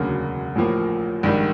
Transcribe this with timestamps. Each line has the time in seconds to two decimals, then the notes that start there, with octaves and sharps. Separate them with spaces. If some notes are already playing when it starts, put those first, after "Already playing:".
Already playing: E1 D2 C#3 F#3 A#3
0.55 A1 A2 F3 A#3
1.23 A#1 G#2 D#3 G3